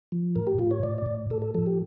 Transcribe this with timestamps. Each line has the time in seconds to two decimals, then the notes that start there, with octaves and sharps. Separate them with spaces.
0.12 F3
0.35 A2 A#4
0.47 G4
0.58 A2 F4
0.71 C#5
0.83 A2 D5
0.98 D5
1.06 A2
1.30 A2 A4
1.42 A4
1.54 F3 A4
1.66 G4